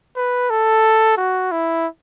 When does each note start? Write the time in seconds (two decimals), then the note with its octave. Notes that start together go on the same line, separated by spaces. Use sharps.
0.16 B4
0.50 A4
1.17 F#4
1.52 E4